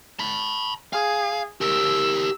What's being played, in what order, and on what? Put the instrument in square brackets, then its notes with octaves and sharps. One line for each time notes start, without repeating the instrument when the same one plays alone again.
[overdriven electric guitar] A5 B5
[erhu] G#4 [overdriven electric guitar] F5
[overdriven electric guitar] G4 A#4 [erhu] E6